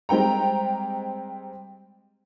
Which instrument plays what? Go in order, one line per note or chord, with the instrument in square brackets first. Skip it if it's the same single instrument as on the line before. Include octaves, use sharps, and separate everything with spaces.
[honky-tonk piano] G3 G#3 C4 G5 A#5